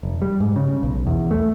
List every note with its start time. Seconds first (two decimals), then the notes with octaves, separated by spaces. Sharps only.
0.03 F1
0.22 G3
0.40 G#2
0.56 C#3
0.83 B1
1.07 E2
1.31 A3